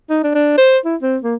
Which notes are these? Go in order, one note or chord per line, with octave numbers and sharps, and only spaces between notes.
D#4
D4
D4
C5
E4
C4
A#3